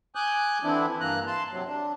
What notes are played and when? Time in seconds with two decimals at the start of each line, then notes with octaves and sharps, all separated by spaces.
0.15 G#5 D6 D#6 F#6 G6
0.63 D3 E3 C4 D4 E4
1.00 G2 E3 A#3 A#5 F#6
1.27 A5 C6
1.51 C3 F#3
1.68 D4